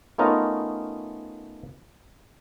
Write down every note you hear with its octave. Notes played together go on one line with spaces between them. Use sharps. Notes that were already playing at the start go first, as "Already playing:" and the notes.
A3 B3 C#4 D#4 F4 A#4